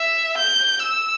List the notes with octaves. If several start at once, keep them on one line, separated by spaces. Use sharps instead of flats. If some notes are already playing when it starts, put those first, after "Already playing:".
Already playing: E5
G6
E6